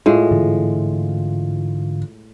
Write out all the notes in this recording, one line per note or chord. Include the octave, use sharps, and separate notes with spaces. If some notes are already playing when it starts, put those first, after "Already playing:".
A2 G#3 F4
G#2 D3 E3